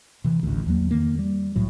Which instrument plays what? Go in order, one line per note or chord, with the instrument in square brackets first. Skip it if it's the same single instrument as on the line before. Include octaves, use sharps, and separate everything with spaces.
[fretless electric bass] C3 E3
A1 D2
E2 F#3 A#3
F2 D#3 A#3
G3
C2 A2 F#3